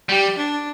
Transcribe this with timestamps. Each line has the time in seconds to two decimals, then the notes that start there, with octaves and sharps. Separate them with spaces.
0.09 G3 G4
0.37 D4